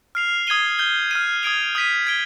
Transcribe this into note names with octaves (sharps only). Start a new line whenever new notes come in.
F6 C7 F7
D#6 G#6 C7 D#7 G7
G6 C7 G7
F6 C7 D#7
D#6 G#6 D7 F7
D#6 G6 B6 D#7
G#6 D7 G7